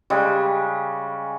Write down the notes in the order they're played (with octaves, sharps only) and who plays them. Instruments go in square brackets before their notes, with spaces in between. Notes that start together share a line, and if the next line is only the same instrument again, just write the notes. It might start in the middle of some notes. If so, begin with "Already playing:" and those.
[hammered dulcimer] C#3 G3 G#3